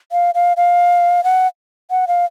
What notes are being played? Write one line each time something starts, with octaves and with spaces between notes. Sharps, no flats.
F5
F5
F5
F#5
F#5
F5